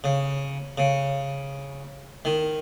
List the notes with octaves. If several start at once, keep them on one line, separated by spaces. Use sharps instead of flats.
C#3
C#3
D#3